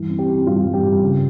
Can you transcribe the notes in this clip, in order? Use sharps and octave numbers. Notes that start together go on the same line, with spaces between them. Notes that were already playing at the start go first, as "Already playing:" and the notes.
Already playing: G2 E3
C4
G4
C4
G2 F4
G2
G4
G2
C#3